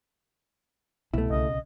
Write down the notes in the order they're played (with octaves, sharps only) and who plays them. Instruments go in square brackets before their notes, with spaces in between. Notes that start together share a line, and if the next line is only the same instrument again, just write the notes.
[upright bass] C2 [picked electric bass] B2 [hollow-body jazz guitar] A3 E4
[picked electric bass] B1 C#3 [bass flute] D#5